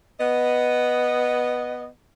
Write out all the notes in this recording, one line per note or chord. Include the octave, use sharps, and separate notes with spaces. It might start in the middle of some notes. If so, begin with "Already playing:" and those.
B3 D#5